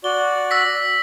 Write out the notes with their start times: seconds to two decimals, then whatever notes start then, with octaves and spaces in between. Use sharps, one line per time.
0.04 F#4 D5 G7
0.51 E6 A#6 B6